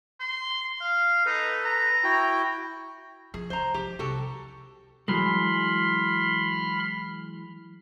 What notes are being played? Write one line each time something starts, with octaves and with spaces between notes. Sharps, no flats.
C6
F5
D#4 A4 B4
A#5
E4 F#4 G5
F3 G#4
C#2 C5 A#5
F3 G#3 G4
C2 C3 F#4 G4 A4
E3 F#3 G#3 B5 C6 F6